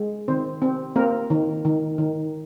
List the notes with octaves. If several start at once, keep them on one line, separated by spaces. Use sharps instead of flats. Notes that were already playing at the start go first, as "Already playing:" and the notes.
Already playing: G#3
D#3 C4 C5
C4
A#3 C4 A#4
D#3
D#3
D#3